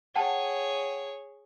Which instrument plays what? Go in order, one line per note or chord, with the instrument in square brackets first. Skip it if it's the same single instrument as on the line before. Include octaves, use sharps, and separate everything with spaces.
[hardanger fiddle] G#4 C#5 [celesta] F#5 G5 A5